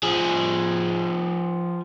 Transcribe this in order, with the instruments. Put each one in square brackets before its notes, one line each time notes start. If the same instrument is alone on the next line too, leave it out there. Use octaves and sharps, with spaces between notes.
[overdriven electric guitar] F3 G#4